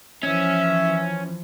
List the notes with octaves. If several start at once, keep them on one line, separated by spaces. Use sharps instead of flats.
E3 F3 C#4 E5